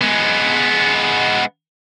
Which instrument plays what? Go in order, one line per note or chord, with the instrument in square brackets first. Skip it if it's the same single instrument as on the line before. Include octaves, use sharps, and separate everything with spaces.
[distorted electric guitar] G#3 B3